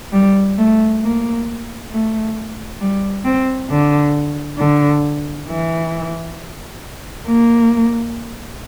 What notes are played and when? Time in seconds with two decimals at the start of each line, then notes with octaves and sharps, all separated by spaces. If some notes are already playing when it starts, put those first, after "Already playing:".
0.13 G3
0.58 A3
1.02 A#3
1.92 A3
2.81 G3
3.25 C4
3.70 D3
4.59 D3
5.48 E3
7.27 A#3